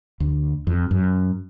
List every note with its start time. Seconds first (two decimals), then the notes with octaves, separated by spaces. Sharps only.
0.20 D2
0.67 F2
0.91 F#2